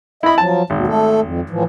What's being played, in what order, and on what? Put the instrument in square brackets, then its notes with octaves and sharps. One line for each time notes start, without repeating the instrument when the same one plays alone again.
[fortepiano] E4 B5 [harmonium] D#5 E5
[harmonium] F3 F#3 [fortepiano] A5
[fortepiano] G#1 [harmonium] D#2 B2
[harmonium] A3 A4
F2
A2 E3 F3